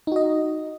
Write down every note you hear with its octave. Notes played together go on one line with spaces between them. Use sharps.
D#4 F#4 D#5